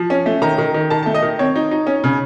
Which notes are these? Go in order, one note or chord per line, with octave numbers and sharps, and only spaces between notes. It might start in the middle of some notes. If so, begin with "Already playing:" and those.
Already playing: F3
C#4
A3
D#3 A#5
D#3
D#3
D#3 A5
A3 A5
D#5
D#3
C4 C#5
D#4
D#4
C#4
C#3